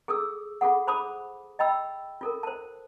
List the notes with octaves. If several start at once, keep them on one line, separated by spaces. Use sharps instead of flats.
G#4 A4 D#6 E6
F4 G#4 A4 F#5
C5 A5 B5 D6 D#6
D#5 G5 B5 E6
F4 A4 A#4
C5 A5